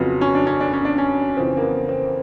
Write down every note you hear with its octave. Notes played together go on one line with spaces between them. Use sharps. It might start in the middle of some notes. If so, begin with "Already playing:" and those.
Already playing: F2 C#3 F#3 B3
C#4
D4
C#4
D4
C#4
D4
C#4
F2 C#3 E3 C4
A#3
B3
C4